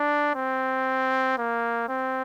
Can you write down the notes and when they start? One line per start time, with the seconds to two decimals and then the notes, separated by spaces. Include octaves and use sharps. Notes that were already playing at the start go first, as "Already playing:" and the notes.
Already playing: D4
0.35 C4
1.38 A#3
1.89 C4